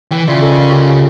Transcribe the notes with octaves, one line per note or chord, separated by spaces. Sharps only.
E3 G5
C#3 F4 D5 E5
A4 A#4 D#5
G4